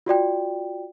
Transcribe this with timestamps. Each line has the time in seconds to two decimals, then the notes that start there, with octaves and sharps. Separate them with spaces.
0.06 F4 F#4 D5 G5